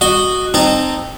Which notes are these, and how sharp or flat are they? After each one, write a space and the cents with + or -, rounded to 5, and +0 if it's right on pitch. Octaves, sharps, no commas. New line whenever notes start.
F#4 +0 D#5 -10
C4 +0 D#4 -20 A5 -15